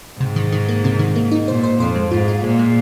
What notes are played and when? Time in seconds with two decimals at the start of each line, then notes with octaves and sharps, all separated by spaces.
0.20 G#2 C3
0.36 D#3
0.52 D#3
0.68 A#3
0.84 C3
0.99 D#3
1.16 A#3
1.32 D#4
1.48 A#2 C5
1.63 C5
1.80 F2 C5
1.96 G#3
2.11 G#2 F4
2.28 F4
2.44 A#2 G#3
2.59 G#3